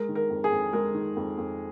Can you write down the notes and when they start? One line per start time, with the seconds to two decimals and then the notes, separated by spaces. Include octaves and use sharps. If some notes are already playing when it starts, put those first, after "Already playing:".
Already playing: G#3 A#4
0.09 D#3
0.15 A#4
0.30 F2
0.44 G#4
0.51 F2
0.73 G#3 A#4
0.94 D#3
1.16 F2
1.38 F2